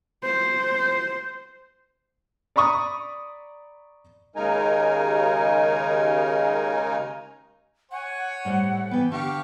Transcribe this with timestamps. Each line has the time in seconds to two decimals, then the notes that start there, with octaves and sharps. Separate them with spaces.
0.23 C5
2.56 D5 A#5 B5 C#6 D#6
4.36 D#2 C#3 G#3 D#4 A#4 G#5
7.91 C#5 F#5 G#5
8.45 A2 G3 C5
8.70 A3
8.91 E3 B3 B4 G5
9.11 D3 G4 F5 A5 C#6